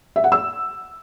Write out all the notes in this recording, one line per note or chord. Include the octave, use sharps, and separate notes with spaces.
E5
F#5
E6